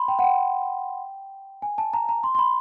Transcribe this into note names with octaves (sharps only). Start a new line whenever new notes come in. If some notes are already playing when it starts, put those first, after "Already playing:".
Already playing: B5 C6
G5
F#5
G5
G#5
A5
A#5
A#5
C6
C6
B5